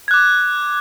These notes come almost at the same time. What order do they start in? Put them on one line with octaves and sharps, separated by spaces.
G#6 F#6 D6